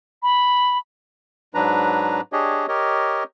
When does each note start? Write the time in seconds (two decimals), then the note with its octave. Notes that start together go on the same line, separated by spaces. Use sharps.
0.23 B5
1.54 G#2 F#3 D4 B4 A#5
2.33 D4 G4 G#4 C#5 D#5
2.68 G4 A#4 C#5 D#5